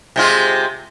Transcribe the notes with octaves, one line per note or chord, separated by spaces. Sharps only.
C3 G#3 F4